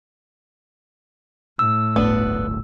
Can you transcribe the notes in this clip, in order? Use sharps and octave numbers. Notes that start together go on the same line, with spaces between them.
A2 E6
D1 G1 A3 B3 D4